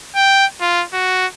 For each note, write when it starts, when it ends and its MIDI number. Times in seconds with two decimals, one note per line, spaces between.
0.16 0.46 79
0.61 0.84 65
0.93 1.26 66